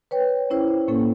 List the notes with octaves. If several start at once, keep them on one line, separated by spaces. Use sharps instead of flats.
B4 C#5 G5
C#4 E4 C5 G5
A2 A#3 C#4 A4